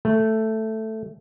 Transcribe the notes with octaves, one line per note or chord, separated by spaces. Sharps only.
A3